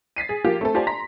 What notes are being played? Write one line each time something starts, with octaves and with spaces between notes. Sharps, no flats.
A6 B6 C7 D#7
G#4
F3 A#3 F4 G4
A3 C4 A4
F4 G4 C5 D5 G#5 A5
A#5 C6 A#6 B6